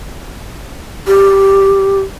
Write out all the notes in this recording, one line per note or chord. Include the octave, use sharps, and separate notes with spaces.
G4